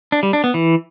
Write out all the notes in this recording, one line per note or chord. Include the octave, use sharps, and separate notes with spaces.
D4
G3
D4
B3
E3